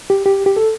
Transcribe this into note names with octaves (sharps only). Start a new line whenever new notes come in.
G4
G4
G4
A4